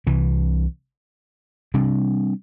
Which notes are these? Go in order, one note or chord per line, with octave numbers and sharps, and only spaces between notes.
C2 C3 E3
C3 G3 D4